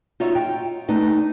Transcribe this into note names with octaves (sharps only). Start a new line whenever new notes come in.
D#4 F4 F#4 C#5 D#5 E5
G5
A3 D#4 B4 D5